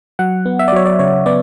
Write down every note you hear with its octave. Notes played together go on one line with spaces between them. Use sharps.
F#3 F#5
B3
E5
D5
F#3 C#5
D5
C#3 C#5
B3 D5